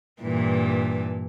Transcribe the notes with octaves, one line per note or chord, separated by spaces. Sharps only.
G2 A#2 E3